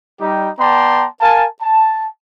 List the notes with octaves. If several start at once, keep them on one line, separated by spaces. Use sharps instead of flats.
G3 D#4 G4
B3 D5 G5 A5 A#5 C6
A#4 F5 G#5 A5
A5